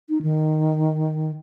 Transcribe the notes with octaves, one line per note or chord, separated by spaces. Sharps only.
D#4
D#3